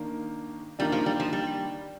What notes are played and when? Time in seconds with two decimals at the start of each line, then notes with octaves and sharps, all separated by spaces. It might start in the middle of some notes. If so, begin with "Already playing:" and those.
Already playing: D#3 A#3 D4
0.79 D#3 G3 A#3 D4
0.92 F3
1.06 G3
1.20 F3
1.33 G3